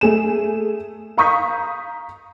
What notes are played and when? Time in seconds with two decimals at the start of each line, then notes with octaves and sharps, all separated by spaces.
0.01 A3 G#4 E7
1.17 F5 A#5 C#6 D#6 G6 B6